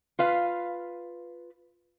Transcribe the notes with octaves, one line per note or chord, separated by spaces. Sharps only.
F4 B4 F5